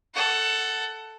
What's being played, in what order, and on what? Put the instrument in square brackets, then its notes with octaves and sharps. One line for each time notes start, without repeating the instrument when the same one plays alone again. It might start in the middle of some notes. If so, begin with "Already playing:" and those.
[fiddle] A4 F#5